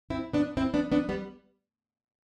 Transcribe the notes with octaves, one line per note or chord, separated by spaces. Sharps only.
C4 E4
B3 D4
C4 E4
B3 D4
B3 D4
G3 B3